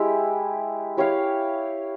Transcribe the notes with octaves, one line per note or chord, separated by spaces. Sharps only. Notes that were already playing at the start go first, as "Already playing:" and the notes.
Already playing: G#3 E4 G4
E4 G4 C#5 F5